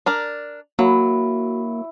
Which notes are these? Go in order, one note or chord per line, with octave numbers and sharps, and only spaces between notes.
D4 A#4 D5
F#3 A#3 E4 F#4